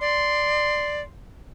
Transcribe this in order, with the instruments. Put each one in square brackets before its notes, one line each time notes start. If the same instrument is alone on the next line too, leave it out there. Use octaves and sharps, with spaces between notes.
[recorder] D5 [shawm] C6